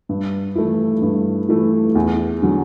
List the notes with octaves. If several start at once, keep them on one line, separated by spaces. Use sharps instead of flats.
G2
E3 A3 E4
G2
E3 A3 E4
E2
D3 F#3